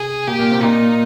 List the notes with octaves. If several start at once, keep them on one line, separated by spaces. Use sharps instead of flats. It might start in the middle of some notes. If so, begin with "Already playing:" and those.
Already playing: C3 G#4
A#2 A#3 G4
A#2 A#3
C3 C4
A#2 A#3 D#4